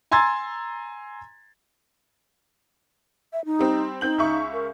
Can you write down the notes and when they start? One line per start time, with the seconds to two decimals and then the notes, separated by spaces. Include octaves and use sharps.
0.11 G#5 A#5 C6 E6 G#6 A6
3.33 E5
3.45 D#4
3.59 G3 C4
4.01 C4 D#4 G6 F#7
4.18 C#2 E5 C#6
4.53 A#4